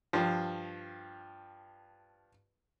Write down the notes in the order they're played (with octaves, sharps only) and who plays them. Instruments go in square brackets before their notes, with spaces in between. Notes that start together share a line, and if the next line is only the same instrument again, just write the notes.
[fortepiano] G2 F3